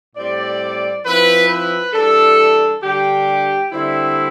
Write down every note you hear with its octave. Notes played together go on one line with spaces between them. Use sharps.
A2 G3 C4 D5
F3 C4 E4 B4
B4
E3 G3 D4 A4
D3 G3 D4 G4
D3 G3 C4 E4